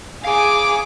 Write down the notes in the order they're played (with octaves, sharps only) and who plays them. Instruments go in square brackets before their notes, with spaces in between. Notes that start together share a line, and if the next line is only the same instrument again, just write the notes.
[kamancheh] G#4 D6 [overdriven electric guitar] F5 G#5